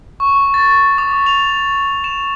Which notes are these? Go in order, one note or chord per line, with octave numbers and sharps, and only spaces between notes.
C#6
A6
D6
F7
E7